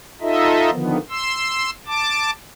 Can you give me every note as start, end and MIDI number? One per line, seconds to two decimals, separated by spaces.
0.21 0.70 63
0.21 0.70 65
0.21 0.70 69
0.21 0.70 75
0.21 0.70 76
0.70 0.97 50
0.70 0.97 51
0.70 0.97 53
0.70 0.97 59
1.10 1.70 84
1.10 1.70 88
1.86 2.31 81
1.86 2.31 86